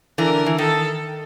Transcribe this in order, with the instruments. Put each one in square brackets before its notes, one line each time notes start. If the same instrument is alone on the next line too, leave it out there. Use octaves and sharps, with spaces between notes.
[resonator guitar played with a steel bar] D3 E3 [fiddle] A#4
[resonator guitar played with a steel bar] E3
[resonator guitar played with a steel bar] D#3 [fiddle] A4